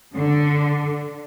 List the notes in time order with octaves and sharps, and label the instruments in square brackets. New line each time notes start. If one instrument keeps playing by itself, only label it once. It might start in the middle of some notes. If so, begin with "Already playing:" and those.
[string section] D3